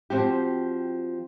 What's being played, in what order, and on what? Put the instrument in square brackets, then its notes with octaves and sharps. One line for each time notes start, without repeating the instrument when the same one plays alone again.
[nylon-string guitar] F3 C4 F#4 G4